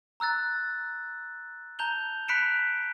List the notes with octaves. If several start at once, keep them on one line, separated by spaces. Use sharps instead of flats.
A#5 E6 F#6 A6
A5 A#5 G6 F7 G7
B5 F#6 B6 C#7 D7 E7